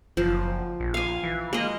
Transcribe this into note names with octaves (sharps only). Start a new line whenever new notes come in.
F#1 F3
A#1
F5 G#5
E3
G#3 A#3 D#5